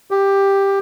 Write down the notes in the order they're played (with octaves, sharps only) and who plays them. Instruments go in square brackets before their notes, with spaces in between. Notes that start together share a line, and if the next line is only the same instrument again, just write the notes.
[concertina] G4